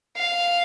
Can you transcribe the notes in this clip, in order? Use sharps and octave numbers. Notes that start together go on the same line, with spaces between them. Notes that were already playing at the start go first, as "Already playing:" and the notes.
F5